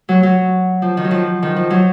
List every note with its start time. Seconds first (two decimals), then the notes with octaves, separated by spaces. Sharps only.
0.09 F#3
0.23 F#3
0.82 F3
0.97 D#3
1.04 F#3
1.11 F3
1.43 D#3
1.56 F3
1.70 F#3